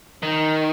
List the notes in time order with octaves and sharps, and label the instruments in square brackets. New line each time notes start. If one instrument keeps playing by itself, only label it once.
[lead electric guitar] D#3